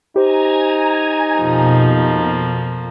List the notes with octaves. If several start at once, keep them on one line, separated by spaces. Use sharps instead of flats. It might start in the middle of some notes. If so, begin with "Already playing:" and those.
D#4 G4 C5 G#5 A#5 G#6
F2 B2 F3 A#3